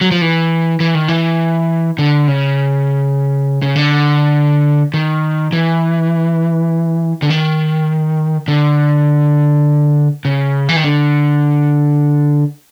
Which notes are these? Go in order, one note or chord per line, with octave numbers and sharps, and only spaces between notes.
F#3
F3
E3
E3
D#3
E3
D3
C#3
C#3
D3
D#3
E3
D3
D#3
D3
C#3
E3
D#3
D3